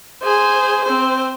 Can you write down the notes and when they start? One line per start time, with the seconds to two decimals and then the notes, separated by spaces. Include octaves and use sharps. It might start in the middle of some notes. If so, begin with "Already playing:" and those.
0.23 G#4 C5
0.84 C4 C5